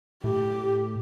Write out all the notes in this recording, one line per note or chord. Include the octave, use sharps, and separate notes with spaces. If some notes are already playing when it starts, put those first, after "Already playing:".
A2 G4